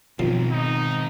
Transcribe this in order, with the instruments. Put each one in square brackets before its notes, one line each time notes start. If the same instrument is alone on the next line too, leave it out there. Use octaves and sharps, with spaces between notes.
[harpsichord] F#2 F3 C6 [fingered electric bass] B2 [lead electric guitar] D#3 C4
[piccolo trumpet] D#4